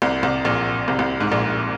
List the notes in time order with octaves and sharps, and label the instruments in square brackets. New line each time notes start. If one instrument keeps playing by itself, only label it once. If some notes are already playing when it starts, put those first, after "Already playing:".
[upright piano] C2 C3
C2 C3
A#1 A#2
C2 C3
C2 C3
G#2
A#1 A#2